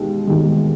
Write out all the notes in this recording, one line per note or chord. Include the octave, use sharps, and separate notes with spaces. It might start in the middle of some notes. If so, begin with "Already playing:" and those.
Already playing: E1 D#2 D#3 G#3
E1 D#2 D#3 G#3